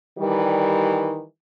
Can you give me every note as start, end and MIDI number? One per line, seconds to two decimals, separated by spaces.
0.19 1.22 51
0.19 1.22 52
0.19 1.22 55